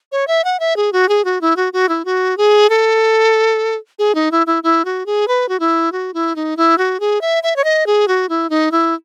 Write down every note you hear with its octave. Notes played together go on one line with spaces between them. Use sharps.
C#5
E5
F#5
E5
G#4
F#4
G#4
F#4
E4
F#4
F#4
E4
F#4
G#4
A4
G#4
D#4
E4
E4
E4
F#4
G#4
B4
F#4
E4
F#4
E4
D#4
E4
F#4
G#4
E5
E5
C#5
D#5
G#4
F#4
E4
D#4
E4